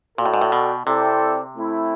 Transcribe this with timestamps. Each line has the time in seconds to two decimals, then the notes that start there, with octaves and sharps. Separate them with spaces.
0.18 A#2 F#4 A4 D5 G5
0.26 A2
0.34 G#2
0.42 A2
0.52 B2
0.86 C3 C4 E4 A4 D5 G5
1.56 A3 C4 E4